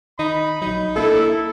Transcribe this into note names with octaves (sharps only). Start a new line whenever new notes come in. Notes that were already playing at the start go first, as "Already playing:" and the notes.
D#3 D#4 B5
A#1 F#3 D#4
C2 A#3 D4 E4 A4